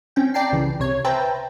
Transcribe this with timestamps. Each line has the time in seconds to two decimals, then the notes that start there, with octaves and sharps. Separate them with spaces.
0.16 C4 C#4 G5
0.34 D5 G5 A5 A#5 C7
0.52 C2 C#3 E3
0.79 C2 C3 C#5 G#6
1.05 B4 C5 E5 G5 A5 A#5